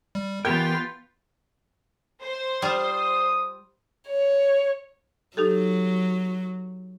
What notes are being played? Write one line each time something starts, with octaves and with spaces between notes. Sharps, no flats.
G3
E3 B3 F4 G4 A#4 G5 G6
C5
G3 F4 D#6
C#5
F#3 D#4 G4 A4